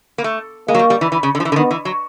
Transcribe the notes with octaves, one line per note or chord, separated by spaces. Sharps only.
A#3
A3
G#3 A#3
F#3
G3
G3
E3
E3
C#3
D3
F3
E3
D3
D#3 B3
E3
F#3